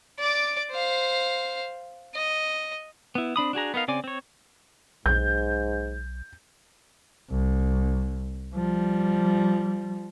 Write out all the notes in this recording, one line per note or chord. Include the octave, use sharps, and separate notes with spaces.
D5 D6
C5 F5
D#5
B3 E4
C4 D4 B5 D#6
D4 F#4 G#4 A#5
B3 D#4 A#4 F5
C#3 C4 D5 G#5 D6
C4 C#5
B1 G#2 G6
C2
F3 G3